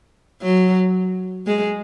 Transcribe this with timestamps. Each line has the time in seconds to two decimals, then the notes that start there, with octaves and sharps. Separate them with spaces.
0.42 F#3
1.47 G#3